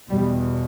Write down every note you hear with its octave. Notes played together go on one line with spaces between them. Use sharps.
E2 B2 G3